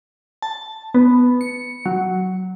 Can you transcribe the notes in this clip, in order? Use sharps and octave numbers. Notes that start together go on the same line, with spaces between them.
A5
B3
C#7
F#3